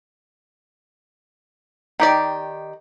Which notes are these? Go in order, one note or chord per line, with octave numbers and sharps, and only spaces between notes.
D#3 G4 D5